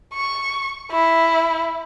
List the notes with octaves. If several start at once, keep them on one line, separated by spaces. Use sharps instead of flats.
C#6
E4